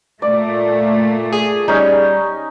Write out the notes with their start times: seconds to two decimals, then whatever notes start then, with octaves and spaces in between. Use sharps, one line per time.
0.22 A#2 A3 D5
1.33 G#4
1.68 G3 C#4 D#4